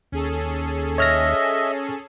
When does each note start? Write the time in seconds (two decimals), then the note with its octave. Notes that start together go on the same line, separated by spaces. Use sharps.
0.12 D#2 C#4 G#4 A4
0.98 C#5 D#5 E5 F6 A#6